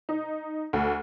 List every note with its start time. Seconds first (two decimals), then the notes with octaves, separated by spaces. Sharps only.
0.09 D#4
0.73 D2